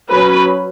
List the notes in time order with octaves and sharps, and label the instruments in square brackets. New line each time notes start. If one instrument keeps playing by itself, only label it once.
[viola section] F#3 C#4 B4